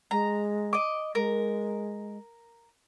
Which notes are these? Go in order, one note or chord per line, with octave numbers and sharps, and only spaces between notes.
G#3 A#5
D#5 D6
G#3 A#4